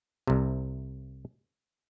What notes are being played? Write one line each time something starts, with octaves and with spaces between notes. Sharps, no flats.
C2 C3